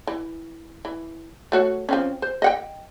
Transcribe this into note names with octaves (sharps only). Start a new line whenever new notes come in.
E3
E3
A3 F#4 C#5
F3 C4 C#4
C5
D#5 F#5 G5